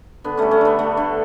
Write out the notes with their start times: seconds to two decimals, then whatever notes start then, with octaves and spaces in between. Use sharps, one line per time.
0.24 D3 B3
0.37 G3 A3 C#4
0.51 A3 C#4
0.61 D3 B3
0.79 D3 A3
0.97 D3